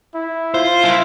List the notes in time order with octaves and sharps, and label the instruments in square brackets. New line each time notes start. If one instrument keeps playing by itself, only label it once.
[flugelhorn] E4
[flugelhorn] F4 [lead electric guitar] C5
[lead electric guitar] E4